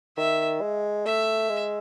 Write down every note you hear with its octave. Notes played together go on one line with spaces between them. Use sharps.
D#3 E5
G#3
A3 E5
G#3